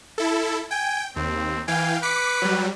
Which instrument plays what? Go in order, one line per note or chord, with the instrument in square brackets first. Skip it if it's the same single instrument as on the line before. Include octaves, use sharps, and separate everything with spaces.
[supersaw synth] E4 A4
[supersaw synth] G5 [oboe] G#5
[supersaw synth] D#2 [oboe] C4
[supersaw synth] E3 F5 G5 [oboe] G#5
[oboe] B4 [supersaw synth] D6 B6 C#7
[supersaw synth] F#3 G3